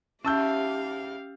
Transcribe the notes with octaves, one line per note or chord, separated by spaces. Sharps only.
G#2 C#4 E4 G4 F5 A5 E6 G6